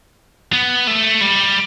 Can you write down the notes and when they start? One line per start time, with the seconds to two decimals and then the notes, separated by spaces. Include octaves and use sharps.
0.53 B3
0.87 A3
1.21 G3